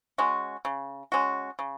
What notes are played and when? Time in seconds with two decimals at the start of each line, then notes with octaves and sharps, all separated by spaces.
0.18 G#3 C#4 F#4
0.65 C#3
1.12 G#3 C#4 F#4
1.59 C#3